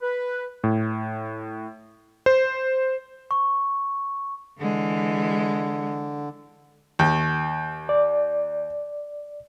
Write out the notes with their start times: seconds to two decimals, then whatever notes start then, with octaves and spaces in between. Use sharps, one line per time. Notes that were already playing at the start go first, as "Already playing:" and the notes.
0.01 B4
0.64 A2
2.26 C5
3.31 C#6
4.60 D3 E3 G#3
6.99 D#2
7.89 D5